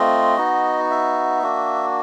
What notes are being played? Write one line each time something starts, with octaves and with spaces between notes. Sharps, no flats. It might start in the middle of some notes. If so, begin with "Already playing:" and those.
Already playing: A3 C4 F4 D#5
B3 D#4 F#4
E5
A#3 D4 F#4